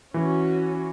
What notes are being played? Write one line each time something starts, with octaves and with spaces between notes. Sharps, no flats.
E3 C#4 F#4